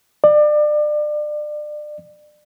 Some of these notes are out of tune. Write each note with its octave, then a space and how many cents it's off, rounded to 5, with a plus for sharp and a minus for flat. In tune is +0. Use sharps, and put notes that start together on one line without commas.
D5 +30